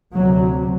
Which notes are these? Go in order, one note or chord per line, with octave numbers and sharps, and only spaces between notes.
D2 C3 F#3